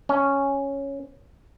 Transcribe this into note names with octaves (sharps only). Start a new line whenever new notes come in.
C#4